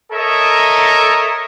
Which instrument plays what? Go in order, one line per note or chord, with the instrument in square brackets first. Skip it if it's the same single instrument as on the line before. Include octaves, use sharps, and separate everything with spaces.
[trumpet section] A4 A#4 C#5 D#5 E5 A#5